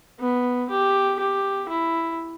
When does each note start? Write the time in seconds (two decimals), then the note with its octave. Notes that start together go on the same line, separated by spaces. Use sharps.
0.20 B3
0.69 G4
1.19 G4
1.69 E4